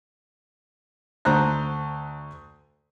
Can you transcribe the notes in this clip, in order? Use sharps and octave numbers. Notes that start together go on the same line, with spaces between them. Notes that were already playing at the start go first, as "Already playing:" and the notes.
D2 C5 A#5 F#6